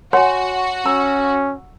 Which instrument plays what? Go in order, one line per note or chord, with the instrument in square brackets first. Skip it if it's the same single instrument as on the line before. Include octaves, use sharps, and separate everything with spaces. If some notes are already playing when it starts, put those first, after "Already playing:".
[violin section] F#4 [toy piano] C#5 C6 [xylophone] F#5 G#5
[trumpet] C#4 [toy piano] A#5 [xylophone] E6